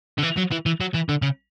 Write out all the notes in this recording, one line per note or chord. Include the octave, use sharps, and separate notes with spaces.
D3
E3
F#3
E3
E3
F#3
E3
D3
C#3